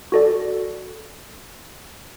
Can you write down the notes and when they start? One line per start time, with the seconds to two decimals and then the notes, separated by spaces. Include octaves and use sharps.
0.12 F#4 A4 D5